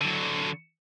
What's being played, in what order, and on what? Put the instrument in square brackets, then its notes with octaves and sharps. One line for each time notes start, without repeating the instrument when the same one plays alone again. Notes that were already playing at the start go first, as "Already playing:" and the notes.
[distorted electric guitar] D3 F#3